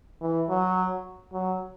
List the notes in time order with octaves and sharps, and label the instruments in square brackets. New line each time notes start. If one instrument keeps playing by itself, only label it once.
[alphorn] E3
F#3
F#3